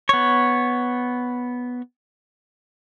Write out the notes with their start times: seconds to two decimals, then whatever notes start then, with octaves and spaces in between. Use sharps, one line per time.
0.09 B3 C#5